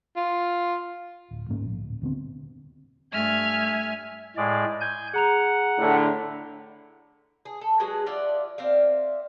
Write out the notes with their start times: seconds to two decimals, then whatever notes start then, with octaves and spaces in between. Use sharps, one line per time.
0.16 F4
1.31 D1
1.49 D2 G#2 A#3 C#4
1.65 A#1
1.79 D1
2.02 D#1 D3 B3 C4
3.12 G2 A3 E5 G#5 F6 G#6
4.37 A2 G#3 D5
4.81 G#5 G6
5.13 G#4 F#5 A#5 F7
5.79 A2 D3
7.45 G#4
7.61 A4
7.80 F#3 G#3 G#4 B4
8.06 F4 D5 E5 F#5
8.58 C4 D5 E5 F5